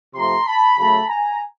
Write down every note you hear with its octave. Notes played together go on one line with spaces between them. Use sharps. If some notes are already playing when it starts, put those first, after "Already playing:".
C3 F3 A3 A#5 C6
A5 B5
C#3 F#3 A3 A5 B5
G#5 A#5